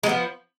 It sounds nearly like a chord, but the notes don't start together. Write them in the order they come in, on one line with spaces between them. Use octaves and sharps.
G#3 B3 F3